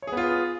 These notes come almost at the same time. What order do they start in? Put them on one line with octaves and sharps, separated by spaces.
C#5 G#4 B3 F4